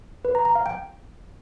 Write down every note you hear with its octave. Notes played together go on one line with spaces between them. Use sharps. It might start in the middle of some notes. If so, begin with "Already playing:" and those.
B4
A#5
A#5
F5
G5